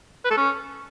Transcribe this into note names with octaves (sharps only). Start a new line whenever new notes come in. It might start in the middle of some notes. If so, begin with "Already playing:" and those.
B4
A4
C#4